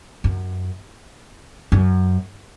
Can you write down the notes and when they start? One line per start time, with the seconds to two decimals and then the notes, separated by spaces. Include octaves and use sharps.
0.24 F#2
1.72 F#2